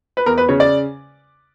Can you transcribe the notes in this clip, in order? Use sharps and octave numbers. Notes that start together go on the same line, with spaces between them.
B4
E2 A#4
B4
C#3 C#5
D5